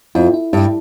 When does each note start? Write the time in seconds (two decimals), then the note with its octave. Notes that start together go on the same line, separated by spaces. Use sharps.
0.15 F2 E4
0.34 E4
0.53 G2 E4